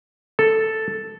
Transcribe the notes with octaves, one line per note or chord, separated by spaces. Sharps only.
A4